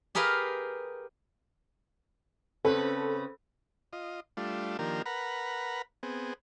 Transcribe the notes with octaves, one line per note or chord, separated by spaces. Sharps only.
G4 G#4 A#4 B4 F5
C#3 C4 A4 B4
F4 D#5
G3 A3 D4 F4
D#3 F3 A#3 D4 G4 A#4
A#4 B4 F#5 A#5 B5
B3 C4 G#4